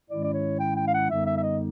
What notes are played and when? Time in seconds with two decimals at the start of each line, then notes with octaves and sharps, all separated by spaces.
0.08 G#2 D#3 G#3 C#4 E4 D5
0.24 D5
0.34 C#5
0.59 G5
0.76 G5
0.88 F5
0.93 F#5
1.09 F#2 D3 G3 B3 D#4 E5
1.27 E5
1.37 E5
1.44 D#5